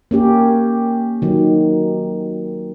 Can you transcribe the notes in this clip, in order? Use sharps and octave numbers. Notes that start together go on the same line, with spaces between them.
A#3 C#4 G4
D#3 F#3